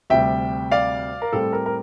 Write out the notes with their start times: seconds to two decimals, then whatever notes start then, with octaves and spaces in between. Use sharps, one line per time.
0.10 D2 C3 G3 E5 G5
0.72 D5 F5
1.22 A#4
1.33 A2 G3 C4 A4
1.53 A#4
1.66 A#4